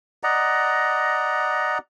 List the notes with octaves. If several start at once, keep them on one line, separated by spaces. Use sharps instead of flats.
D5 D#5 F#5 A#5